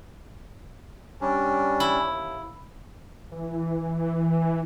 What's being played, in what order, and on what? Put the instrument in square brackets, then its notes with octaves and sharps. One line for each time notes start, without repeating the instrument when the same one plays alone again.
[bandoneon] G3 C#4 D4
[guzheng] E4
[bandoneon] D#2
[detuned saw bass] E3